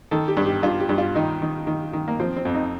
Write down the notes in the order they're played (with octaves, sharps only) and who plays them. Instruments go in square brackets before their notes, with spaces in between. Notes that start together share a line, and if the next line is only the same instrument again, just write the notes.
[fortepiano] D#3 A4
G4
G2
G4
G2 F4
G4
G2
F4
D#3 D#4
D#3
D#3
D#3
A#3
F3 C4
C4
F2
D#4